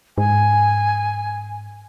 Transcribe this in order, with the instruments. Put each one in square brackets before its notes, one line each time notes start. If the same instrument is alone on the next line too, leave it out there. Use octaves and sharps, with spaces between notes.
[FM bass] G#2 [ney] G#5